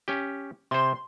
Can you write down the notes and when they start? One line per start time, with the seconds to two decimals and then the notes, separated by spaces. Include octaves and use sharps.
0.08 C#4 G4
0.71 C3 C5 C6